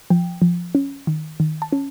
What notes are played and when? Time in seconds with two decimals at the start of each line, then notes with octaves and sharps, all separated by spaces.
0.10 F3 G5
0.42 F3
0.75 C#4
1.07 D#3
1.40 D#3
1.62 A5
1.72 C#4